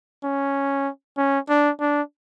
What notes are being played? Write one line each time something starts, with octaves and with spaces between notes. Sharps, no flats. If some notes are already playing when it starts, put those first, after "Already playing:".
C#4
C#4
D4
D4